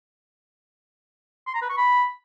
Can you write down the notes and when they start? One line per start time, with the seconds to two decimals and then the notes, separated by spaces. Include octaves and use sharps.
1.47 C6
1.55 A#5
1.62 B4
1.70 C#6
1.77 B5